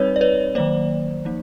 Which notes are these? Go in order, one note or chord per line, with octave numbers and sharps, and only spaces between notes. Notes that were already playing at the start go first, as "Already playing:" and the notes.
Already playing: G3 C4 D#4 B4 C#5
D5
B4 C#5
D#3 F#3 A#3 C5 D5
F3 A#3 D#4